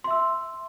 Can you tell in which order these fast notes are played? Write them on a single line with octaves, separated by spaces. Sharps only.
C6 E5 E6